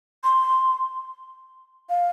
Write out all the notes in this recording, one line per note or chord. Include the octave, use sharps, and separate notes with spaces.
C6
F5